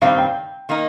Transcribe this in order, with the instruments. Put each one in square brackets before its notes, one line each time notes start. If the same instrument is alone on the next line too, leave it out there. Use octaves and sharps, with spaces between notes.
[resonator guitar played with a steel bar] G2 D#3 G3 C4 [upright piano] F5
[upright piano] G5
[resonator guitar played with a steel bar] D#3 A#3 D#4